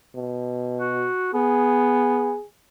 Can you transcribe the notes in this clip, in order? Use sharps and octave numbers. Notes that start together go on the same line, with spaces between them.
B2
F#4
B3 G#4